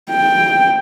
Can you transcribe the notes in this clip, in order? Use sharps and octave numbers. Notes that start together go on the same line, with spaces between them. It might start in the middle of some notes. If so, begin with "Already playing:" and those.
G5